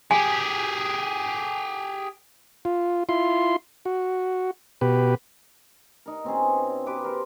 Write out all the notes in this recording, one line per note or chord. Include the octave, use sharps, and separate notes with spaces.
G4 G#4 G#5
F4
E4 F4 C6
F#4
B2 G4 B4
D#4 A#4
B2 C4 C#4 G#4
G4 B4 D6
A#4 C5